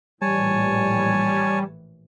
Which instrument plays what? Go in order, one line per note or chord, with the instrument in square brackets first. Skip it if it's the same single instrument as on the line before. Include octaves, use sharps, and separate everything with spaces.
[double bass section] A#1 A2 E3 [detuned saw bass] G3 [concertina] C#5 G#5 A5